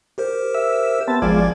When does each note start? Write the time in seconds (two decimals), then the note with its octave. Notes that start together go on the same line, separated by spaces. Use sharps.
0.18 G4 A#4 C5
0.55 E5
1.07 B3 C4 A5
1.22 G#1 F3 G#3 F4 D5 G#6